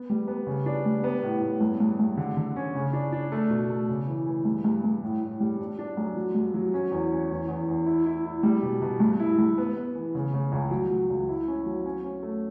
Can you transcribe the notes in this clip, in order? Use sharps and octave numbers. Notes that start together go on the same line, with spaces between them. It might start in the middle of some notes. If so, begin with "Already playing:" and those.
Already playing: B3
G3
B3
C#3
D4
G3
B3
A2
A2
G2
G2
G2
D3
D3
C#4
C#3
D4
D4
A3
B2
A3
C#3
E3
E3
G2
G2
G2
A2
A2
G3
D4
D4
F#2
F#3
G2
F#3
C#4
E2
C#4
E2
E2
E2
E4
E4
E4
G3
B2
B2
G2
E4
G2
B3
B3
E3
C#3
C#3
C#2
F#3
F#3
C#2
E4
C#4
F#3
C#4
C#4
A3